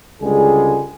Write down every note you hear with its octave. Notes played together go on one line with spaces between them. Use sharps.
C#2 D3 G3 G#3 G#4